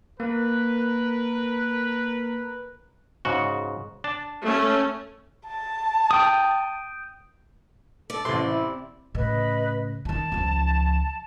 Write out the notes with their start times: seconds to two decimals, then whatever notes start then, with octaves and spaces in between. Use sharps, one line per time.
0.20 A#3 A#4 B4
3.25 G#2 C#3 F#4
4.04 D4 A5
4.42 A3 C#4
5.46 A5
6.11 G5 D#6
8.10 A4 D5
8.25 A1 C3 C6
8.43 E4
9.15 A2 C#3 B4 D#5
10.05 D#3 F3 A5
10.32 C#2 F3